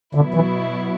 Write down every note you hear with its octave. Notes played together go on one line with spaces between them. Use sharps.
B2 D3 F#3 B3 E4
E3